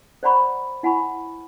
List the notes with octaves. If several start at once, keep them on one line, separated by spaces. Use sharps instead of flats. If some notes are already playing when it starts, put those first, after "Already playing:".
C5 D5 F#5 A#5 B5 C#6
E4 F#5 G#5 B5 C#6